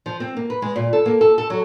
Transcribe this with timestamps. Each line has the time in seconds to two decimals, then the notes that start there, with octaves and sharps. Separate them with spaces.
0.06 F3
0.20 C4
0.37 A#3
0.50 B4
0.62 G#3
0.76 A#2
0.93 A4
1.06 A#3
1.21 A4
1.38 A4
1.50 F#3